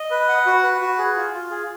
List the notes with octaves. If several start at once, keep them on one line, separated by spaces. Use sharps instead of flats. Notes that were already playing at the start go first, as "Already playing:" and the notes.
Already playing: D#5
B4
F#5
F#4
B4
F#4
G#4
F4
F4
G#4